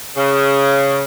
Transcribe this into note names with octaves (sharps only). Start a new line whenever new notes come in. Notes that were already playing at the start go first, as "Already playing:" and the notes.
C#3